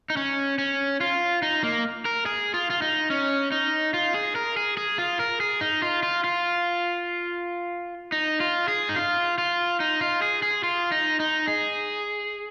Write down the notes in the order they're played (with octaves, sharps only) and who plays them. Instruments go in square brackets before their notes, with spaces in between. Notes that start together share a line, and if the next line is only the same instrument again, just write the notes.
[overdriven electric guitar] D#4
C#4
C#4
F4
D#4
A#3
A#4
G#4
F4
F4
D#4
C#4
D#4
F4
G#4
A#4
G#4
G#4
F4
A#4
G#4
D#4
F4
F4
F4
D#4
F4
G#4
D#4
F4
F4
D#4
F4
G#4
G#4
F4
D#4
D#4
G#4